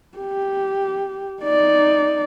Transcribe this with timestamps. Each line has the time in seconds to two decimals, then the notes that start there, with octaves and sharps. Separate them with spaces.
0.18 G4
1.43 D#4 D5